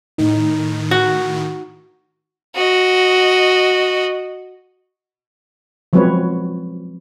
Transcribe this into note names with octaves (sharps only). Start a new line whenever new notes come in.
A2 D#3 D#4
F#4
F#4 D#5
F3 F#3 G#3 C4 B4 C#5